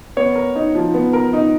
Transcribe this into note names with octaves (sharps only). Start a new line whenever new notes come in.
B3 C#5
A#4
D#4
F3
B3
A#4
D#4